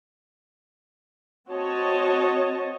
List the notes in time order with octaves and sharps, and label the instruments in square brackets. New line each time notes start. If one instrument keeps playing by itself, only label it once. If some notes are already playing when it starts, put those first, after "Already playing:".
[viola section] C4 F#4 C#5 D#5 A5